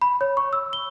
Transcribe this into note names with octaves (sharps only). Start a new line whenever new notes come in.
B5
C#5
C#6
E6
G7